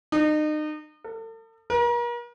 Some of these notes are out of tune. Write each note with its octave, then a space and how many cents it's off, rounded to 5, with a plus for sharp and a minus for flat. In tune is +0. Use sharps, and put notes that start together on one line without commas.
D#4 -35
A4 +40
A#4 +40